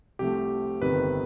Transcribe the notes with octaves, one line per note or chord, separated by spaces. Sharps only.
C2 C3 F3 A3 G4
G1 F2 C3 D#3 B4